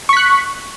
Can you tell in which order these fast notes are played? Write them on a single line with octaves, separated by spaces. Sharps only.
C#6 B6 F#6